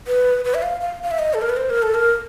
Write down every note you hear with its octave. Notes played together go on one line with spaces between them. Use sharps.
B4
B4
E5
F5
F5
F5
E5
D#5
A4
A#4
B4
C5
A#4
A4
A#4